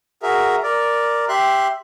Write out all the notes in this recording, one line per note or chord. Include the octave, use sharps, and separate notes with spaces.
F#4 G#4 A#4 E5
A#4 D5
G4 E5 C6 F#6